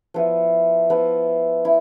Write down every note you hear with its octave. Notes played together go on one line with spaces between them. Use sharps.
F3 B3 E4
F3 B3 E4
E4